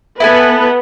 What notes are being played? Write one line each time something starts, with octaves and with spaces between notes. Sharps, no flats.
B3 E4 A4 B4 G#5